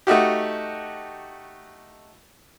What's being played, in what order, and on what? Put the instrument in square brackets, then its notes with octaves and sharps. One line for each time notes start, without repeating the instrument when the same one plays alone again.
[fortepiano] A3 D#4 F#4 G4